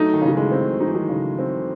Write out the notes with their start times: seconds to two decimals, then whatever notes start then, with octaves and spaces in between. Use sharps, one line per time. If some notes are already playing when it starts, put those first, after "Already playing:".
Already playing: F#3 A3 D#4
0.14 D#3
0.21 C#3 E3
0.28 F#3
0.37 E3 G#3
0.51 C4
0.80 F#3 D#4
0.87 E3
0.95 D#3 F#3
1.09 C#3
1.39 C4